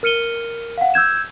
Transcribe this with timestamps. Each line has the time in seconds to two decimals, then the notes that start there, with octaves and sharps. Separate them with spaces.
0.03 A#4 F6 C#7 D#7 G7
0.78 F5 F#5
0.94 E6 G6 G#6 E7